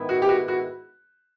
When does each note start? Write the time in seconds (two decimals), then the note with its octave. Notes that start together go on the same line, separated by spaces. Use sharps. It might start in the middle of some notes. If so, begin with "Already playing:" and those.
Already playing: G#2 D#3 G#3 B3 E4
0.09 F#4
0.22 G4
0.29 F#4
0.48 F#4